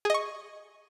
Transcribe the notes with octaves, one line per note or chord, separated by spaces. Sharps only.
G#4 D#5 C#6